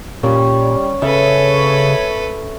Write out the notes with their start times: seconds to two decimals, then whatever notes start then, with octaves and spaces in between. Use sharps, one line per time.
0.23 A#2 G3 C#4
1.02 C#3 A4 B4 C#5 E5